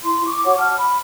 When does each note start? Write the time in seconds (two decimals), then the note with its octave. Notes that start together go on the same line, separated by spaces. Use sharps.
0.04 E4 C6
0.25 C#6 D6
0.45 F#4 C#5 F#5 D6
0.58 F#5 A5 F6
0.77 B5